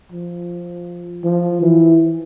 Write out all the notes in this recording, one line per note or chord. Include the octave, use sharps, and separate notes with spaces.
F3
F3
E3